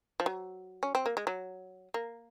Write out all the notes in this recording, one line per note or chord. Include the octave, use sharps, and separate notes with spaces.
F3
F#3
C#4
C4
A#3
G#3
F#3
A#3